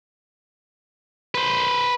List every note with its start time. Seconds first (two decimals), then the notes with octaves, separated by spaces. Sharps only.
1.35 B4 C5